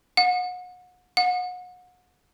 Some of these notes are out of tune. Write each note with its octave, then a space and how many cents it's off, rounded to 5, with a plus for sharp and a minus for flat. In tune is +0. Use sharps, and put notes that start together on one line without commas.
F#5 -35
F#5 -35